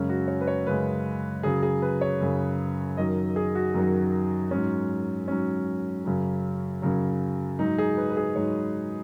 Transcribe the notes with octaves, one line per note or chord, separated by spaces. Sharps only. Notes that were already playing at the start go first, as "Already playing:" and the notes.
Already playing: F#2 C#3 G#3 C#4
F#4
C#5
B4
C#5
F#2 C#3 G#3 B4
F#2 C#3 F#3 G#4
G#4
B4
C#5
F#2 C#3 F#3
F#2 D#3 F#3 D#5
G#4
F#4
F#2 D#3 F#3
G#2 F#3 C#4
G#2 F#3 C#4
F#2 C#3 F#3
F#2 C#3 F#3
G#2 F#3 D#4
G#4
B4
B4
G#4
G#2 F#3 C#5